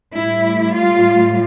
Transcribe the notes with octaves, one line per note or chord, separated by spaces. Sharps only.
A2 G3 E4
F4